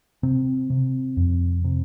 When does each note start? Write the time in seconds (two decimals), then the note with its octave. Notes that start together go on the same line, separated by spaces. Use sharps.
0.23 C3 C4
0.70 C3
1.17 F2
1.64 C3